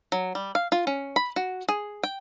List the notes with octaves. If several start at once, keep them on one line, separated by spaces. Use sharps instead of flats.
F#3
G3
F5
F4
C#4
B5
F#4
G#4
G5